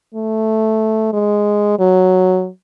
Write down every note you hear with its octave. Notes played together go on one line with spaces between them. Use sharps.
A3
G#3
F#3